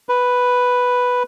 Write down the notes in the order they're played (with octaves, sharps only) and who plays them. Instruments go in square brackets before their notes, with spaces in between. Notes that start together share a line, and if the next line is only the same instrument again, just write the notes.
[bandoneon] B4